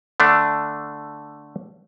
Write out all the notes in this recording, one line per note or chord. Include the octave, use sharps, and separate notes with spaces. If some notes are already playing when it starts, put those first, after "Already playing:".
D3 A3 D4